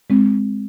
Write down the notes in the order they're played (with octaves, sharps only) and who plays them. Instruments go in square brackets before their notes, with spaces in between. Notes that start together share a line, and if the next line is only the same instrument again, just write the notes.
[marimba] G#3 C4